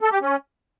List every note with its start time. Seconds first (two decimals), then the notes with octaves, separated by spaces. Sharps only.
0.01 A4
0.11 G4
0.22 C#4